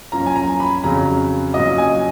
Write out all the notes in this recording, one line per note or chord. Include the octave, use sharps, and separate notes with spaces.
F#2 F3 A#3 C#4 A#5
G#5
A#5
B5
F2 C#3 F#3 C#4 A#5
A#2 F#3 C#4 D#5
G#5